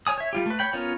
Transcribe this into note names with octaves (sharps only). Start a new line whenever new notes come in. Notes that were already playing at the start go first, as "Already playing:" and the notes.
C#5 G#5 D#6
C#5 E5
G3 F4 G4
A3 B4
C#5 G5 B5
B3 C#4 F4 A#4 C#5